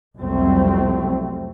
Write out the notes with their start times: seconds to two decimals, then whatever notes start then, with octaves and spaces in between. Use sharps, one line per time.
0.17 C2 F2 F#3 G3 A3 C4